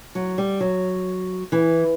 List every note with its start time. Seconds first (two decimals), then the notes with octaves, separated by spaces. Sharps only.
0.15 F#3
0.38 G3
0.60 F#3
1.52 E3